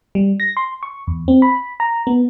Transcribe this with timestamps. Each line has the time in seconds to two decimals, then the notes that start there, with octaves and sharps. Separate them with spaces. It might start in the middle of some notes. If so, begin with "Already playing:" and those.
0.15 G3
0.40 A#6
0.57 C6
0.83 C#6
1.07 E2
1.28 C4
1.42 B5
1.80 A#5
2.07 B3